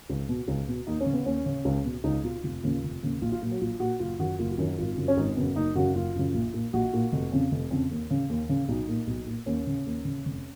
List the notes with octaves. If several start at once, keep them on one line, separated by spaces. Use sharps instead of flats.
C#2
B2
C#2
B2
D#2 D#4
C#4
C#3
B3
D#2 C#4
C#3
C#2
B2
C#2 D#4
B2 F4
F1 F4
D#2 C#3
F1
D#2 C#3
A#1 F4
F4
A#2 F#3
F#3
A#1 F4
A#2 F#4
F#1 F4
F#2 D#3 F#4
F#1 F4
F4
F#2 D#3
F#4
G#1 F4
F#2 C#3
C#4
G#1 D#4
F#2 C#3 B3
F#1 D#4
F#2 C#3 F#4
F#1 F4
F#2 C#3
A#1
A#2
A#1 F#4
A#2
F1
F2 C#3
F1
F2 C#3
D#2
C#3
D#2
C#3
B1 D#4
A#2
B1
A#2
D#2 C#4
C#3
D#2
C#3
F1